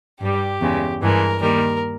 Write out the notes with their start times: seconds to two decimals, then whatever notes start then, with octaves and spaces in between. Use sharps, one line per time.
0.21 G2 G3 G4
0.61 E2 C#3 G#3
1.02 G2 E3 G#3 A#4
1.42 D#2 D#3 G3 A#4